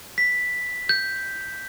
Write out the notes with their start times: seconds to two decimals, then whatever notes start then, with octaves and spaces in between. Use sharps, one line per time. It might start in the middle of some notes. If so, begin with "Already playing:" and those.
0.18 B6
0.89 G6